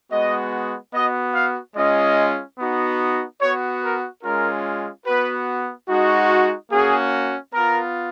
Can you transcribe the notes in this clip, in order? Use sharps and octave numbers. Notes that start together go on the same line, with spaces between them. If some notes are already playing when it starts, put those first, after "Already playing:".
G#3 B3 F#4 D#5
B3 F#4 D#5
F5
G#3 C#4 F4 D#5
B3 D#4 F#4
B3 F#4 C#5
A#4
G#3 C#4 F4 A#4
B3 F#4 B4
G#3 D#4 F#4
A#3 C#4 F#4 G#4
B3 F4 A#4